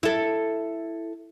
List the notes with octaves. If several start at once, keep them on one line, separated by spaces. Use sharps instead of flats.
E4 A4